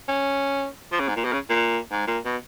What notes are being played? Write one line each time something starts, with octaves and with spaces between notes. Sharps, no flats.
C#4
F3
C#3
G#2
A#2
B2
C#3
A#2
G#2
A#2
B2